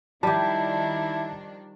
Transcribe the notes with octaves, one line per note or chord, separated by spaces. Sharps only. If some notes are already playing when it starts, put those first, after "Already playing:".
D#3 F3 G3 D4 E4 G4 A5